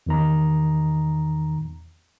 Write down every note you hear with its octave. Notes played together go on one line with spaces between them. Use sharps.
E2 D#3 A#5